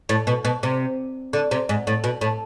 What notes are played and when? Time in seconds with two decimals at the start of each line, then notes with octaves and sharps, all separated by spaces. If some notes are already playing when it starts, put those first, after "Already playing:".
0.09 A2
0.27 B2
0.45 B2
0.63 C3
1.33 D3
1.51 C3
1.69 G#2
1.87 A2
2.04 B2
2.21 A2